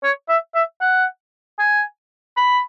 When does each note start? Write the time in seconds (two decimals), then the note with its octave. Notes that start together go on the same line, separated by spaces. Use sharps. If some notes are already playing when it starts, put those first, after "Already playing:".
0.03 C#5
0.29 E5
0.55 E5
0.81 F#5
1.59 G#5
2.37 B5